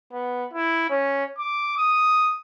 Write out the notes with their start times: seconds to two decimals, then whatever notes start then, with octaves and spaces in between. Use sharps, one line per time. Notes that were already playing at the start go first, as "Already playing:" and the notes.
0.13 B3
0.54 E4
0.90 C#4
1.38 D6
1.77 D#6